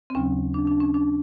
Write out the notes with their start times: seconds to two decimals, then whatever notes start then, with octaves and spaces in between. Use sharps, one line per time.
0.10 C4
0.15 D#2 C#3 F#3 C#4
0.54 D4
0.67 D4
0.80 C#4
0.94 D4